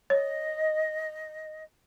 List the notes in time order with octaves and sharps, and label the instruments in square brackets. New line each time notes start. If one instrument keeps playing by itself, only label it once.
[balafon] C#5 [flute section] D#5